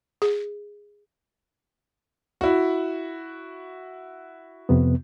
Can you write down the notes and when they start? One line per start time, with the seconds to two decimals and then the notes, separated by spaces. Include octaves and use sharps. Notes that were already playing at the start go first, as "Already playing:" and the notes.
0.22 G#4
2.41 E4 F#4
4.69 F2 C3 B3